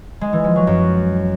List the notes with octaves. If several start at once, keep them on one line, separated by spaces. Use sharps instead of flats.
G#3
E3
F3
F#3
F#2